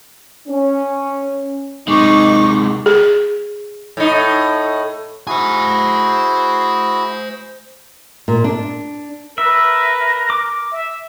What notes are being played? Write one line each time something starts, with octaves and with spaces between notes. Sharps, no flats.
C#4
C3 G#3 D#4 C#6 D6
G#4
A2 D#4
E4 F#4 G#4 C5 G#5
A#2
D4
A#4 B4 E5
D6
E5